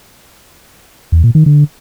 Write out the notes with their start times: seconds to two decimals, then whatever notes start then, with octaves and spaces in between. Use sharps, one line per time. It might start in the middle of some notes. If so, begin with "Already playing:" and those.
1.12 E2
1.24 A#2
1.35 D#3
1.46 D3